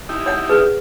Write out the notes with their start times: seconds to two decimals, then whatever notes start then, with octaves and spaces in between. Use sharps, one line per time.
0.09 D#4 E4 G4
0.26 C#5 F#5
0.50 G#4 A#4 B4